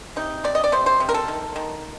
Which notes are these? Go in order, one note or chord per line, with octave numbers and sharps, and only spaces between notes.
C3 D#4
C3 D5
D#5
D5
C3 C5
C5
C3
A#4
A4
D#3
D#3